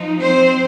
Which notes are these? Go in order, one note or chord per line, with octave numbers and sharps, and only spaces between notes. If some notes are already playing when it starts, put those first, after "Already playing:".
Already playing: F3 D#4
C4 C5